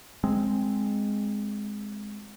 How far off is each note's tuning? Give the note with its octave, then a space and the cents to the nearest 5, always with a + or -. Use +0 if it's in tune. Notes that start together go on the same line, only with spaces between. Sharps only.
G#3 +0 C4 +0